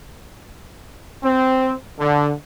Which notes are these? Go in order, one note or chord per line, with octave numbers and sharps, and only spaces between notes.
C4
D3